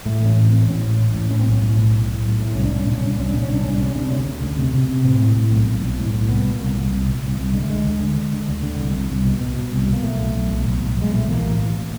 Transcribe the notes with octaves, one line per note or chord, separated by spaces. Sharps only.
A2 A3
A1 C#4
A2
C4
A1
A2 C#4
A1
A1
A2
A2 C#4
C4
B1
C#4
A2
B1
A2
A2
B1
A2
C2 C#4
D4
C2
C#4
A#2 D4
C2 C#4
D4
C2 C#4
A#2 D4
C#4
C2 D4
C2 C#4
C3 D4
C#4
C3 D4
D2 C#4
D2
D2
C3
C3
C3
A2 C4
A2
A2
B1
B1
B1
A2
A2
C2 B3
A#2
A#3
C2
C2
C2
A#2
C2
C2
D3 G#3
A3
D3 G#3
D2
D3
D3
D3
D2
D3
C2
C2
C2
B2
B2
B2
C2
B2
A#3
B1 A3
B1
B1
B1
B1
B1
B1 G#3
A#2 A3
A1 A#3
A1
A1